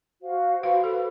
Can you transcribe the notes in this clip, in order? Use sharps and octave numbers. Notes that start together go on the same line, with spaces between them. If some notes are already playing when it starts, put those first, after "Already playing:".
F#4 C5 F5
F#4 B4 C5 F5
A4